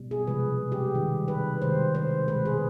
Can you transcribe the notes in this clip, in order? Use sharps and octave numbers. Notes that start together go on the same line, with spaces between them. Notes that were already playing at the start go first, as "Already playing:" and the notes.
Already playing: B2 G3
G#4
C3 F3 G#3 B4
G4
C3 D#3 G3
B4
C3 D#3 G#3 C5
C5
B2 G#3 B4
G#4